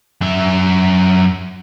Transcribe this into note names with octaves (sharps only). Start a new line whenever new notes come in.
F#2 E5